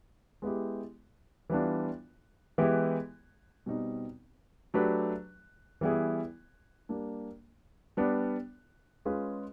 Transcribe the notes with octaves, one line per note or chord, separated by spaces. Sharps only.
G#3 B3 E4 G4
E3 G3 B3 D4 F4
E3 G#3 B3 E4 G4
B2 G3 C4 D#4
F#3 A3 D4 G4 B4
E3 G3 B3 E4 G#4
G3 A#3 D4
G3 B3 D4
G#3 C#4 F4 G#4 B4